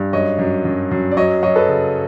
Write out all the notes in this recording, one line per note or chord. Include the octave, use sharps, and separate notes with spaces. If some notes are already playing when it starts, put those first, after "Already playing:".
Already playing: G2
F#2 C#5 D#5
F#2
F#2
F#2
D5
F#3 C#5 D#5
F#3 C#5 D#5
A4 B4
C#3